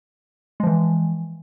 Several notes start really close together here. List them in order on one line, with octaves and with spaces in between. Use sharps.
G#3 F3 E3